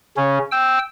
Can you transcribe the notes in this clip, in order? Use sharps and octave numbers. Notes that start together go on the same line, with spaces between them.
C#3 C#4
G5 E6